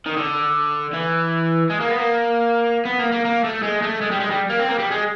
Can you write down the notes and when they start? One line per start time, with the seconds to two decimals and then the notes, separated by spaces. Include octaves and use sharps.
0.06 D#3
0.17 D3
0.93 E3
1.70 G#3
1.80 A#3
1.90 B3
1.99 A#3
2.85 B3
2.99 A#3
3.12 A#3
3.25 A#3
3.44 A3
3.63 G#3
3.82 A3
4.01 G#3
4.11 G3
4.20 G#3
4.31 G3
4.50 A#3
4.59 C4
4.68 A#3
4.79 G3
4.91 G#3